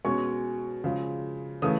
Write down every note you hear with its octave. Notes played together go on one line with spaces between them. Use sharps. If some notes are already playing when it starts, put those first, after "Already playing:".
B2 G#3 C#4 C#6
C#3 F3 G#3
C#3 E3 A3 D#6